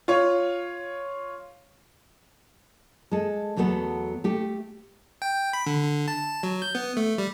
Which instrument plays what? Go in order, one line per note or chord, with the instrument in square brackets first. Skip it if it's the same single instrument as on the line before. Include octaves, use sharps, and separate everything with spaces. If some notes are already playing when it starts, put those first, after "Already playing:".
[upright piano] F4 C#5
[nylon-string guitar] G#3 A4
E2 F#3 A3 B3 A4
A3 G4
[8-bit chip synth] G5
B5
D3
D3
A5
F#3
G6
B3
A3
G3